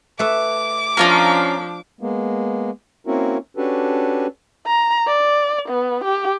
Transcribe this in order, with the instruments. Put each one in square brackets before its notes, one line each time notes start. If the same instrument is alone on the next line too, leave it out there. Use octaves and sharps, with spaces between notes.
[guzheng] A3 B4 E5 [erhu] D6
[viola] F3 D4 [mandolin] C#4 F4 A#4
[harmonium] G#3 A#3 B3
A#3 C4 C#4 E4 F#4 A#4
C#4 D4 F#4 G4 A4 B4
[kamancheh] A#5
D5
B3
G4